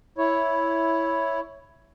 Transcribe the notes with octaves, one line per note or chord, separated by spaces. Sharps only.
E4 C#5